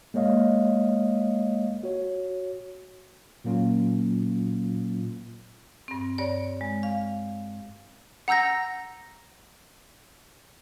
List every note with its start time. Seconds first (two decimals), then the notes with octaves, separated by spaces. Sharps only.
0.14 G#3 A#3 C#5 D#5 F5
1.83 F#4 C#5
3.44 A#2 F#3 A#3 C#4 F4
5.88 G2 C4
6.18 G2 C#5 D5
6.61 G#3
6.83 F5
8.28 F#5 A#5 E6 G6 A#6